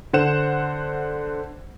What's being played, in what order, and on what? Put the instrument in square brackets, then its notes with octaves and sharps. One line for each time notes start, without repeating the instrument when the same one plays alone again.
[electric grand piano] D3 C5 F#5 E7